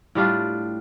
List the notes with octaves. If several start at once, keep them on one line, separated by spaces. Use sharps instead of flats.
A2 G3 D4 F4